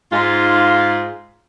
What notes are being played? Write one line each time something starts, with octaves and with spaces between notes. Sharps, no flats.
G#2 F4